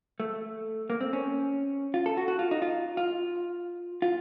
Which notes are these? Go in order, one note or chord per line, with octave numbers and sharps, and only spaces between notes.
A3
A#3
C4
C#4
F4
A4
F#4
F#4
F4
D#4
F4
F4
F4